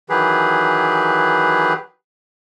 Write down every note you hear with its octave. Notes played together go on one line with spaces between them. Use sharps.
D#3 E3 F#3 G4 G#4 B4